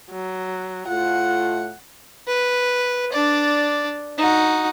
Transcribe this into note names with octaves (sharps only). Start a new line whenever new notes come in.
F#3
A2 A3 F4 F#5
B4
D4 D5
D#4 F#4